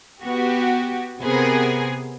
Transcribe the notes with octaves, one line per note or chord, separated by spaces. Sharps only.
B3 F#4 G4
C3 B3 G#4 A#4